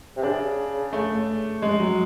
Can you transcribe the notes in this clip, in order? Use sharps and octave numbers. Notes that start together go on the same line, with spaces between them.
C3
C#3 D4
A3
G#3
F#3